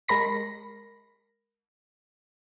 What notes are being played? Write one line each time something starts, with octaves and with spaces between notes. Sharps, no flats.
G#3 A#4 B5 A#6